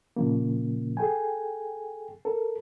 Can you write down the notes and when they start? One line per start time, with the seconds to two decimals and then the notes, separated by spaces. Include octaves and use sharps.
0.16 A#2 C#3 F3 A#3
0.97 G#4 A4 G5 G#5
2.25 A4 A#4